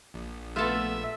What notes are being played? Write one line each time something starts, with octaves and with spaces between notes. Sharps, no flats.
A#1
A3 B3 F4 A4 E5